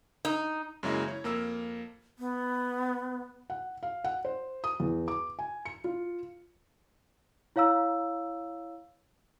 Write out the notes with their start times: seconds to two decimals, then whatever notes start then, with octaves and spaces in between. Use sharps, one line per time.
0.25 D#4
0.83 F#2 C#3 F#3 G#3 A#3 E4
1.07 E4 C#5
1.24 F2 A#3 A#4 E6
2.18 B3
3.50 F#5
3.83 F5
4.04 F#5
4.25 C5
4.64 D#6
4.80 E2
5.08 D6
5.39 G#5
5.65 C#7
5.84 F4
7.56 E4 C#5 F5 A#5 E6